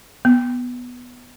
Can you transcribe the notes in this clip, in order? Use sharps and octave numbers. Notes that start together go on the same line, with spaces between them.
B3